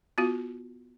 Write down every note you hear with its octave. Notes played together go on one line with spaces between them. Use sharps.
B3 F4 F#4